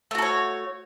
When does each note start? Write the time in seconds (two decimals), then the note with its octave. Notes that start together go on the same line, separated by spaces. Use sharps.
0.11 A3
0.15 F#4
0.18 A4
0.22 C#5